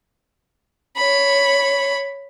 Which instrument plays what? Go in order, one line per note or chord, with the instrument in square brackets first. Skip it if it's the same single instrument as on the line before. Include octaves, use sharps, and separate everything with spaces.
[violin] C#5 B5